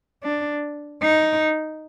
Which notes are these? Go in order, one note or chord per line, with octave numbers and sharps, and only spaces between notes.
D4
D#4